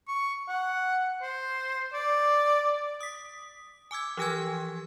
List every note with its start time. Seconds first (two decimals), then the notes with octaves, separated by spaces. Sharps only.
0.08 C#6
0.48 F#5
1.22 C5
1.93 D5
3.01 D#6 B6
3.91 G#5 D6 E6 G#6
4.17 E3 F3 G4 G#5 E6 G#6